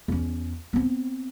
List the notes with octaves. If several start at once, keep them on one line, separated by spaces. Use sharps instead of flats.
E2 C#4
B3 C4